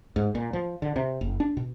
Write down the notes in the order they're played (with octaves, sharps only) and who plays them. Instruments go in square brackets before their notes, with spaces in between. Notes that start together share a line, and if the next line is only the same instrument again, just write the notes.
[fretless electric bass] G#2
A#2
F3
D3
C3
F#1
D4
B2